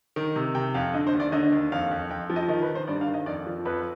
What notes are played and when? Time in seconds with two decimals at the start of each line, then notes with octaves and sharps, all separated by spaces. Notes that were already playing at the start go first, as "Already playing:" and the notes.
0.16 D#3
0.36 C3
0.55 C3 G5
0.74 F2 F5
0.94 D3 D#5
1.07 C5
1.14 D#2
1.20 D5
1.32 D3 D#5
1.52 D#2
1.72 F2 F5
1.91 F2
2.10 F2 G5
2.30 F3
2.36 D#5
2.49 D#3 D#5
2.62 B4
2.69 D#3
2.75 C5
2.88 G2 D5
3.01 F5
3.07 D#3
3.14 D#5
3.26 F2 D5
3.47 F3
3.65 F2 B4